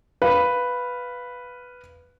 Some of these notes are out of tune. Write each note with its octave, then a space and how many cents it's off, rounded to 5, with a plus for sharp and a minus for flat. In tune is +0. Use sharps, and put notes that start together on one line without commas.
B4 +0 F5 +0